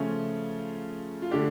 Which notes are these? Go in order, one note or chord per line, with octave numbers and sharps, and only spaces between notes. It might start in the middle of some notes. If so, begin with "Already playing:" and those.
Already playing: C#3 F3 A3 C#4 F4
F4
D3 A3 D4 G4